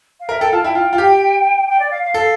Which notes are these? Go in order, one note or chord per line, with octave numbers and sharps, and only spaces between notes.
F5
A#4 E5
A4 G5
F4 A5
E4 G5
F4
F4
G4
G5
D5
F5
F5
A4 F5